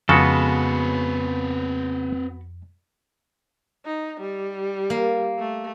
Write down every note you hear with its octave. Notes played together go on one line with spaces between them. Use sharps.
F2 C#3 G#3 B3 C4 F#4 A4 B4
D#4
G3
A#3
A3